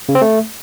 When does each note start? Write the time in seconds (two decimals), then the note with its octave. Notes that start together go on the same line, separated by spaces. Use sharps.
0.09 C#3
0.15 C4
0.22 A3